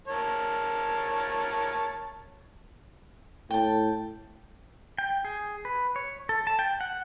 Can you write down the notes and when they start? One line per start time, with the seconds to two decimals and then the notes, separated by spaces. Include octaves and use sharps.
0.08 A#4 C#5 A5
3.51 A2 G5 A5
4.98 G5
5.25 G#4
5.65 B4
5.96 C#5
6.29 A4
6.47 A5
6.59 G5
6.81 F#5